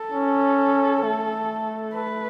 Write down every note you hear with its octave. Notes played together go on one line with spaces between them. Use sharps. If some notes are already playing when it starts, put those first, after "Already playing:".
Already playing: A4
C#4
A3
B4